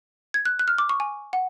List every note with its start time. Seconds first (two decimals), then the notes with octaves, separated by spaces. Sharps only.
0.34 G#6
0.46 F#6
0.59 F#6
0.68 F6
0.78 D6
0.89 C#6
1.00 G#5
1.33 F#5